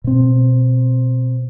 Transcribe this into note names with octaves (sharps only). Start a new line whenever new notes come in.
B2 C4